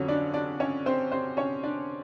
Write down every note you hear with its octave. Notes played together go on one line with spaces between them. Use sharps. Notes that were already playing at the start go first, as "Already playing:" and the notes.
Already playing: F2 D3 F#3 C#4 C#5
D4 D5
D4 D5
C#4 C#5
C4 C5
C4 C5
C#4 C#5
D4 D5